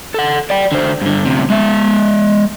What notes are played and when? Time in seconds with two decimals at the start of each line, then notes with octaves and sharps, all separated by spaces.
0.14 A4 F#5
0.50 D5 G5
0.72 D3 C5
1.01 G2 D3
1.25 D2 C3
1.50 G#3 E5